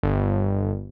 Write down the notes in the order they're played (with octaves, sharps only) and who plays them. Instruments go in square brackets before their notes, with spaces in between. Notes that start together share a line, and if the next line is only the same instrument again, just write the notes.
[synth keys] G1